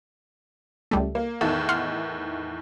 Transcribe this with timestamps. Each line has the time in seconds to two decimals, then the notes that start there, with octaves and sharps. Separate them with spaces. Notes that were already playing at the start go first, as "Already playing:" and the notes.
0.91 C#2 G3 A3
1.15 A#3
1.41 E2 A2 D#3 A4
1.69 F#5 C6 F6